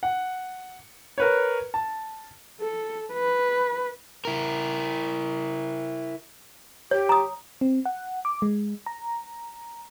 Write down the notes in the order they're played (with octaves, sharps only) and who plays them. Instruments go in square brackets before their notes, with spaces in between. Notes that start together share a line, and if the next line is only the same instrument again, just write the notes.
[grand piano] F#5
A#4 B4 C#5
A5
[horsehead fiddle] A4
B4
[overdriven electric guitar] E4 A#4
[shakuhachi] G4 [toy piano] C#5
[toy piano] A#5 D#6
[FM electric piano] C4
F#5
D6
G#3
A#5